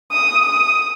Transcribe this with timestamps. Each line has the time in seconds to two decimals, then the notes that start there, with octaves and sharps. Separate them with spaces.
0.12 D#6
0.44 D#6